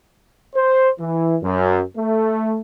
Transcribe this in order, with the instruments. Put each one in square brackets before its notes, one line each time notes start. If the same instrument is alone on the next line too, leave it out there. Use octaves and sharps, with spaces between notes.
[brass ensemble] C5
E3
F#2
A3